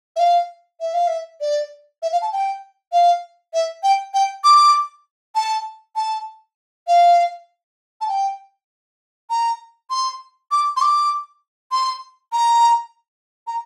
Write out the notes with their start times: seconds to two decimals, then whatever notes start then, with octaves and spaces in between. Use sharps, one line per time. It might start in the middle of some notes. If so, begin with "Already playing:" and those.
0.16 E5
0.19 F5
0.81 E5
0.94 F5
1.07 E5
1.41 D5
2.02 E5
2.12 F5
2.22 A5
2.33 G5
2.92 F5
3.54 E5
3.83 G5
4.14 G5
4.44 D6
5.35 A5
5.96 A5
6.87 F5
8.01 A5
8.08 G5
9.30 A#5
9.90 C6
10.51 D6
10.77 C6
10.81 D6
11.72 C6
12.33 A#5
13.47 A#5